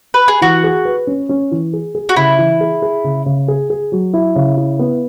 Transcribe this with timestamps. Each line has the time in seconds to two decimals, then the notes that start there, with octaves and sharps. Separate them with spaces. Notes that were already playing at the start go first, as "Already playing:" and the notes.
0.14 B4
0.28 G#4
0.41 E3 F#4
0.64 G#4
0.85 B4
1.07 C#4
1.29 C#4
1.51 E3
1.73 G#4
1.95 G#4
2.09 F#4
2.16 C#3 E4
2.38 E3
2.61 G#4
2.82 G#4
3.04 C#3
3.26 C#3
3.48 G#4
3.70 G#4
3.92 F#3
4.14 E4
4.36 C#3
4.57 E4
4.79 B3